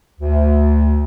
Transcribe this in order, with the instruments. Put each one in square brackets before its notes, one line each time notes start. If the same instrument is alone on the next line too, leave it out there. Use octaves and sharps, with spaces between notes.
[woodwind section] D2